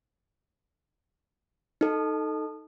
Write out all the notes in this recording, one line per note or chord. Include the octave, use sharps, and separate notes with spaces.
D#4 A4